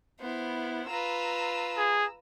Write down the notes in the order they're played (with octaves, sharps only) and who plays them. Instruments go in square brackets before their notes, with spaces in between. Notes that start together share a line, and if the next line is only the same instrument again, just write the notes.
[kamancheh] B3 E4 [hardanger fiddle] C5
[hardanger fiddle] F4 B4 [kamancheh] A#5 E6
[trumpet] G#4